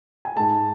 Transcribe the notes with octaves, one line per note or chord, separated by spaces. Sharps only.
G#5
G#2 G#3 A5